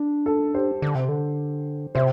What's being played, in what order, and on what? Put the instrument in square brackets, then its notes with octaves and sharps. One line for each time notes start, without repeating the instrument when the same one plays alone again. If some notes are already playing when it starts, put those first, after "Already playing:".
Already playing: [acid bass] D4
[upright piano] A4
G4 C5
[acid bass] D3
C3
D3
[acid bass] C3 [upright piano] C5 E5